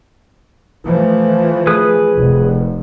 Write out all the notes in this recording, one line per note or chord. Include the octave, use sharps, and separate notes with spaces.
E3 F3 A3
G#4 B4 D#6
F1